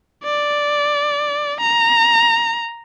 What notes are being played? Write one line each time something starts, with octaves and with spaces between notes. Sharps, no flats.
D5
A#5